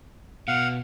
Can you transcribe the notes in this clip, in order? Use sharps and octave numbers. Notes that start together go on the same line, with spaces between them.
B2 F5 F#5